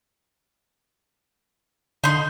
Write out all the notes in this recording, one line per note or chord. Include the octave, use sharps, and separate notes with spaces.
D3 D#4 C6